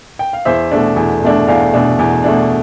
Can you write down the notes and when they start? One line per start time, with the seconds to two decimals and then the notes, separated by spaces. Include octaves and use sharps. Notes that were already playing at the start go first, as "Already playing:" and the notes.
0.19 G5
0.33 F5
0.45 E2 C5 E5
0.71 B2 A3 D4
0.96 E2
1.22 B2 A3 D4
1.48 E2 D5 F5
1.73 B2 A3 D4
1.99 E2
2.24 B2 A3 D4